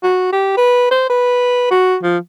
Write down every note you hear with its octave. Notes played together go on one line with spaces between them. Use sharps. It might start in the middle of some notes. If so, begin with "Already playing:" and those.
F#4
G4
B4
C5
B4
F#4
F3